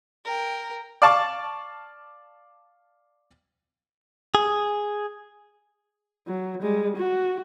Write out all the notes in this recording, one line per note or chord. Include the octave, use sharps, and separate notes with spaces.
A#4 G5
D5 F5 A5 C#6 D6
G#4
F#3
G3 G#3
F#4